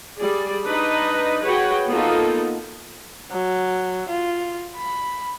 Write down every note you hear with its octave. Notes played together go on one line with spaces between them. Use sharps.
G3 G#4 D5
D4 D#4 B4 D#5
F#4 G#4 B4 C#5 F#5 G5
A#3 B3 D#4 F4 A4
F#3
F4
B5